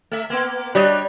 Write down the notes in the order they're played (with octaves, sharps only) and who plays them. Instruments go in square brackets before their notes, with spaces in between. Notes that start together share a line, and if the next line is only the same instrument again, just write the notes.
[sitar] A3 E5
A#3 B3
[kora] G3 [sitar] D4 C#5 D#5